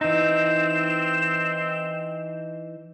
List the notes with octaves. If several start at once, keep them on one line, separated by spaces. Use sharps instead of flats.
E3 C4 D#4 E7